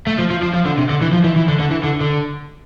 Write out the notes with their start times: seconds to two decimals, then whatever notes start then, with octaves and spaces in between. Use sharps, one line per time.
0.07 A3
0.19 F3
0.31 F3
0.42 F3
0.54 F3
0.66 D3
0.78 C3
0.90 D3
1.02 E3
1.13 F3
1.24 E3
1.36 E3
1.48 D3
1.60 D3
1.71 E3
1.83 D3
2.01 D3